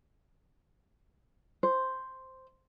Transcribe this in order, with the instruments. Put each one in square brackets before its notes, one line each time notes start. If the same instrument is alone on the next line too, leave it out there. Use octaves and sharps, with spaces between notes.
[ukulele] C5